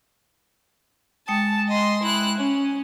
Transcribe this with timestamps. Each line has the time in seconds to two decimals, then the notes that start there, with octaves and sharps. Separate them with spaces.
1.28 G#3 G5 A5 D#6
1.68 D#5 C6
2.02 E4 F#6
2.38 C#4